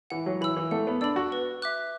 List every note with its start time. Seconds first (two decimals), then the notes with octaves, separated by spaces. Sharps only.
0.10 E3 F#5
0.26 F#3
0.41 E3 B5 E6
0.57 E3
0.71 A3 F#5
0.87 B3
1.01 D4 B5 E6
1.16 F#4
1.32 B4
1.62 E5 D6 F#6